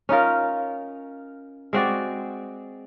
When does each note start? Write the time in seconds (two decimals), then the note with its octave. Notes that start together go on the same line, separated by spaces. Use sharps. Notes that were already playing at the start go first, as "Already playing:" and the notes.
0.09 C#4 D#4 F4 A#4
1.73 G#3 C4 F#4 D5